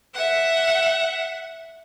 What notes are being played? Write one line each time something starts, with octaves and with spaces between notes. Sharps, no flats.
E5 F#5